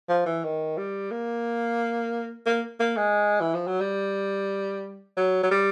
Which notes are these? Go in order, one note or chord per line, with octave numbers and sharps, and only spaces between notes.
F3
E3
D#3
G3
A#3
A#3
A#3
G#3
E3
F3
F#3
G3
F#3
F#3
G3